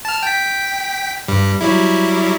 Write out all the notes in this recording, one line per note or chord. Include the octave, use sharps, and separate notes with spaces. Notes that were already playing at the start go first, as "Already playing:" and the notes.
A5 F6
G5 B6
G2 G3
F#3 G3 E4